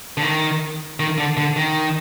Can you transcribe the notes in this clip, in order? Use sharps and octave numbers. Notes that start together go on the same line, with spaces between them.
D3
D#3
D#3
D3
D3
D#3